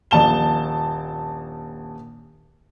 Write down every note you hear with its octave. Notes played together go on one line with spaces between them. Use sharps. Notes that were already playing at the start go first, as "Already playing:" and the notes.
D#1 A#1 A5 E7 G7